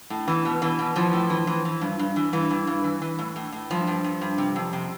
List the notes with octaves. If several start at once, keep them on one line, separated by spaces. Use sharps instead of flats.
A2
E2 E3
B2
E2 E3
B2
E3 F3
A2
E3
E3
E3
G2
G2
E3
G2 E3
G2
G2
E3
E3
A2
A2
A2
G2 F3
G2
G2
G2
C3
F2
C3